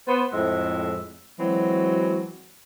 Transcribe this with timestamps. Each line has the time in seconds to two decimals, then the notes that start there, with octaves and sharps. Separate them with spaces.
0.08 B3 C5
0.32 F2 A2 G#3 C4 E5
1.39 E3 F#3 G#3 C4 F#4